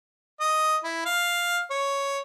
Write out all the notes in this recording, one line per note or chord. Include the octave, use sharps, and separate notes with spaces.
D#5
E4
F5
C#5